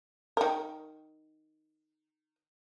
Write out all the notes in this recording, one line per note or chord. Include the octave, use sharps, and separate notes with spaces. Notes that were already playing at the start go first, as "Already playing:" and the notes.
D#3 A#4